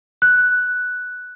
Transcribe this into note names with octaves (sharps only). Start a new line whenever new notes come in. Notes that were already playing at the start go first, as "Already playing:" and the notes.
F#6